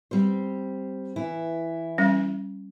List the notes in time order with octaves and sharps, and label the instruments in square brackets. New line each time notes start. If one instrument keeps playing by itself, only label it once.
[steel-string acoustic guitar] G3 C4 C5
E3 E4
[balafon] G3 C#4